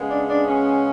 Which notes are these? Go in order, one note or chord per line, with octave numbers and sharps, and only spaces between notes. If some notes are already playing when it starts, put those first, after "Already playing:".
Already playing: C#3 G#3 B3
D4
D4
C#4